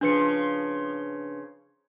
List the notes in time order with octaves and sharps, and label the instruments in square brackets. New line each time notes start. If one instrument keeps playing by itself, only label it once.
[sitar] C#3 F3 [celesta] D4 B4 C#7